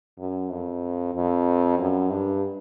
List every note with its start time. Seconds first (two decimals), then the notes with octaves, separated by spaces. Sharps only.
0.18 F#2
0.51 F2
1.15 F2
1.78 F#2
2.10 G2